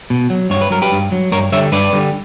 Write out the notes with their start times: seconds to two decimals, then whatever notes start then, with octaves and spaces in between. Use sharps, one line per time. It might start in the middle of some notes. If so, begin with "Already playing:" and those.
0.10 B2
0.30 F#3
0.50 G2 C#5
0.61 B4
0.71 F#3 A#4
0.82 G4 B4
0.92 G2
1.12 F#3
1.32 G2 A#4 C#5
1.52 D3 G3 C#5 E5
1.72 G2 B4 D5
1.92 D3 G3